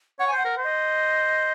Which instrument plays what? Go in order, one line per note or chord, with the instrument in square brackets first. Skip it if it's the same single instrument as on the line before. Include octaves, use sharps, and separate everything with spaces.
[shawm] C#5 [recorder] F#5
[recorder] G#5
[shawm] C5
[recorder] F#5
[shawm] A#4
C5
[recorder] D#5